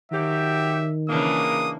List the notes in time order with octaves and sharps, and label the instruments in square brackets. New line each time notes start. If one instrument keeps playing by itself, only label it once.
[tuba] D#3 [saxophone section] F#3 G4 [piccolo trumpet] E5
[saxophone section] A#2 G#3 A#3 [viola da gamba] C#3 E3 D4 [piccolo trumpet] D#6